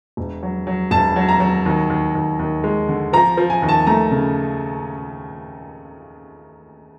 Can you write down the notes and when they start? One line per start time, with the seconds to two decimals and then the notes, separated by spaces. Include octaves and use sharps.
0.17 E1
0.43 F#3
0.67 F#3
0.91 E1 A5
1.16 F#3
1.29 A#5
1.40 F#3
1.66 D#2
1.90 D#2
2.15 D#2
2.39 D#2
2.64 G#3
2.89 D3
3.13 F3 A#5
3.37 F3
3.50 G#5
3.62 D#2
3.69 A5
3.87 A3 A#5
4.11 C#3